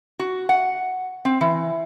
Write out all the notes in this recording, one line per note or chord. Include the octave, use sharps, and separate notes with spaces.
F#4
F#5
C4
E3